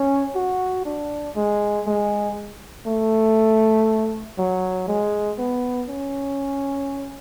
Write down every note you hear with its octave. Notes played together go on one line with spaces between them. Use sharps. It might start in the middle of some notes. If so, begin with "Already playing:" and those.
Already playing: C#4
F#4
D4
G#3
G#3
A3
F#3
G#3
B3
C#4